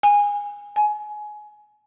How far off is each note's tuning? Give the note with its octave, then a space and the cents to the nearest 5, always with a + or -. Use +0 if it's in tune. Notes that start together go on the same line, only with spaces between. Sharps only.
G#5 -20
G#5 +20